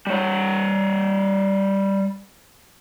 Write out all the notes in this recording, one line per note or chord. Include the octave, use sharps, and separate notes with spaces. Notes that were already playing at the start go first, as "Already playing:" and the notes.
G3 C#5